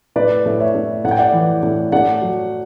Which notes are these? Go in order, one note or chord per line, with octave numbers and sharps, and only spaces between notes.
A2 B4 D5
A2
C#5 E5
A2
A2 F#5
G5
D5 F#5
E3
A2
A3 D5 F#5
F#3